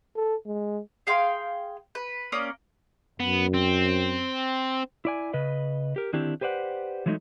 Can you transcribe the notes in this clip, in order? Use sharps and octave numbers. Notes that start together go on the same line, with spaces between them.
A4
G#3
G#4 F5 G5 C6
B4
A#3 C#4 D5 D#6
F#2 B3
C4
E4 D5 G#5
C#3 B4 D#5
G4 A#4
D3 D#3 C4 D4 E4 G4
G4 B4 C5 D5 F#5
E3 F#3 G#3 A3 C#4 D#4